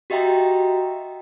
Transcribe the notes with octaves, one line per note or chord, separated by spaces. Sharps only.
F#4 G4 D#5 E5 G5 A#5